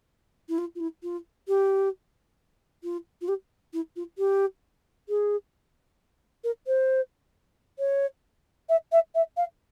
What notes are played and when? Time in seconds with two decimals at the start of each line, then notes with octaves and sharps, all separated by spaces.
0.49 E4
0.58 F4
0.75 F4
0.80 E4
1.03 F4
1.48 G4
2.83 F4
3.21 F4
3.28 G4
3.73 E4
3.96 F4
4.18 G4
5.09 G#4
6.44 A#4
6.67 C5
7.79 C#5
8.69 E5
8.92 E5
9.14 E5
9.37 F5